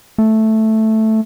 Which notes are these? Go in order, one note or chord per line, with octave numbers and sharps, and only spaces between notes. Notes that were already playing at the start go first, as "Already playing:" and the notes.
A3